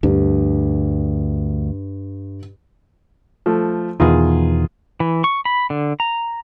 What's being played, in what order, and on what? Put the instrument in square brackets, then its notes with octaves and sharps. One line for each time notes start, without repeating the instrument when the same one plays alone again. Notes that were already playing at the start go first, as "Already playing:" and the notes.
[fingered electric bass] D2 [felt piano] G2
[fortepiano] F3 A3
[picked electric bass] E2 B2 D#3 [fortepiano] F4 G#4
[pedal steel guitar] E3
C#6
B5
D3
A#5